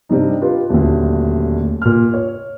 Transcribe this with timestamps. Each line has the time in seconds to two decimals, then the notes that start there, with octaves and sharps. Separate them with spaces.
0.09 G2 C3 G3 D#4
0.42 F4 G4 B4
0.69 D#1 D2
1.82 A#2 F6
2.14 C#5